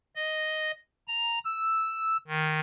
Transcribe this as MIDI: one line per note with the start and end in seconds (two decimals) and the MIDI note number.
0.16 0.72 75
1.08 1.39 82
1.45 2.17 88
2.27 2.60 51